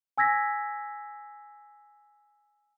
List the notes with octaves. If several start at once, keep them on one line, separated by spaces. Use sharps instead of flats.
G#5 E6 G#6 A#6 B6